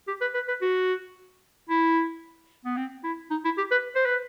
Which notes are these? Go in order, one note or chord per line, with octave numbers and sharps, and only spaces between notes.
G4
B4
B4
B4
F#4
E4
B3
C4
E4
D#4
E4
G4
B4
C5
B4